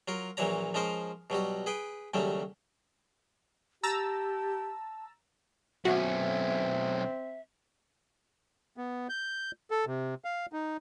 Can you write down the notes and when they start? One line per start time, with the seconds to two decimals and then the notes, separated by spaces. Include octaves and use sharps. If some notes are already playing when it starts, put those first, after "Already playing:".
0.08 F#3 F4 A#4
0.37 A#1 A#2 E3 F#3 C#5 A#5
0.74 F3 G#3 C#4 F4 A#4 C5
1.30 B2 F#3 G3 F#4
1.66 G#4 B4 G5
2.14 D#2 C#3 F#3 G3 A3
3.83 G4 A5 A#5 E6 A6
5.85 B1 C4 C#4 F#4 E5
8.77 B3
9.09 G6
9.71 A4
9.86 C3
10.25 F5
10.53 D#4